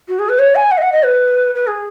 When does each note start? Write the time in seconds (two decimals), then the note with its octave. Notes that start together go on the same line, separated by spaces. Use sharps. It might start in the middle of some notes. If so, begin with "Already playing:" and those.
0.08 F#4
0.19 G#4
0.29 B4
0.39 C#5
0.55 G#5
0.71 F#5
0.77 D#5
0.82 F#5
0.92 D#5
1.03 B4
1.55 B4
1.67 G#4